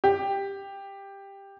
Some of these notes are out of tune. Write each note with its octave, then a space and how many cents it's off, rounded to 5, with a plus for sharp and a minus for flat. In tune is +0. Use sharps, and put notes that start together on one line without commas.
G4 +10